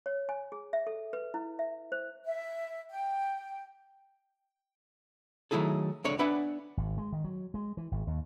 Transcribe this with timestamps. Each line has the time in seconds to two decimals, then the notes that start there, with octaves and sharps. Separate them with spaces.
0.06 C#5
0.29 G#5
0.52 G#4
0.73 E5
0.87 A4
1.13 B4
1.34 E4
1.59 E5
1.92 C5
2.26 E5
2.91 G5
5.51 D#3 F#3 A3 E4 G#4 A4
6.04 C#2 D3 C#5 D5
6.19 B3 D4 B4 E5 F#5 G#5
6.77 G#1
6.98 G#3
7.12 D#3
7.24 F#3
7.54 G#3
7.77 E3
7.92 G#1
8.07 D#2